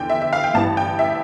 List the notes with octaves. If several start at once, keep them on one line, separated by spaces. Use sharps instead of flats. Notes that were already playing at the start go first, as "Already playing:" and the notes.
Already playing: E2 D3 G5
E5
E5
F5
G5
A1 G2 E3 A5
G5
E5